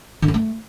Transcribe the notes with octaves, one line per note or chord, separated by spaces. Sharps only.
D3
C#4
A3